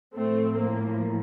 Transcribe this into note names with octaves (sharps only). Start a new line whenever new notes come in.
A2 F3 A3 C4
A#3